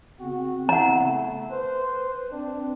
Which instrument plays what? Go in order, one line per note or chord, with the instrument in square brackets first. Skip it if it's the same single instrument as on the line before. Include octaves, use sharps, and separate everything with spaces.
[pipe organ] C#3 B3 C4 [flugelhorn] F#4
[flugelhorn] E4 [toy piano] F#5 A#5
[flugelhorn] A3
[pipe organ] B4 [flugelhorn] C5
[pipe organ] C4 [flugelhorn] D4